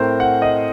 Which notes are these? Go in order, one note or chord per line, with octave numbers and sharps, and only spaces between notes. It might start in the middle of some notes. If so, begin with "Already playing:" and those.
Already playing: A2 A3 C4 A#4 C5
F#5
D#5